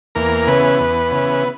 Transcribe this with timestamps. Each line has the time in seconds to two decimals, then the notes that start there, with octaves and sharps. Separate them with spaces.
0.15 E2 A#3 A#4
0.47 C#3 E3 B3 B4
0.80 E2
1.11 C#3 E3